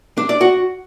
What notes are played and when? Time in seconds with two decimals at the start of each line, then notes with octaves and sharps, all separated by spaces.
0.18 D4
0.29 D5
0.41 F#4